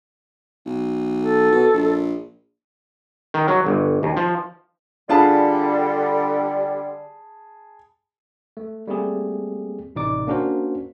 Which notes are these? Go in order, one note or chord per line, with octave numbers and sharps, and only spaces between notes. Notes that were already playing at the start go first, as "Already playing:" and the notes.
B1
A4
B2
A#1
D#3
F#3
G1
D#2
F3
D3 G3 D4 F4 G#4 A5 B5
A3
G3 A3 A#3 C4 G4 G#4
A1 C3 D#4 D5 D6
A#3 C#4 D4 F#4 A#4 C5